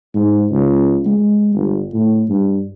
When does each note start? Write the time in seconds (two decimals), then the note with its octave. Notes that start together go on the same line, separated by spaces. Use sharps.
0.14 G#2
0.51 C#2
1.06 G#3
1.55 G1
1.93 A2
2.29 G2